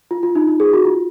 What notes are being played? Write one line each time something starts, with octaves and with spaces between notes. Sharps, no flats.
F4
F4
D#4
D#4
G#4
F#4
F4